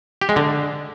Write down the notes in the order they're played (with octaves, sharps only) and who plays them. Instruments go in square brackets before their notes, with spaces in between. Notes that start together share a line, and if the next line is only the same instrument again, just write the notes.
[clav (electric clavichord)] G4
G#3
D3